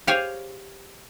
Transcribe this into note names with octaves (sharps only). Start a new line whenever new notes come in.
G4 G#4 C5 C#5 F5 G#5